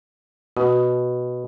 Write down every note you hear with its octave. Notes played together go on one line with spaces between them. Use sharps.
B2 F#4